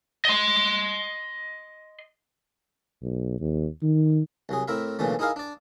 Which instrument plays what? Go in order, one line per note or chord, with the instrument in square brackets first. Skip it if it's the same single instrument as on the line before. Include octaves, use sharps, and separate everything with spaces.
[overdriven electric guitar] D#5 C6
[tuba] B1
D#2
D#3
[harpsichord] C2 F#3 G#4
A2 C4 E4 A#4 E5
B1 A#2 C#3 E3 A3
D#4 E4 G#4 A#4 F5
D4 D5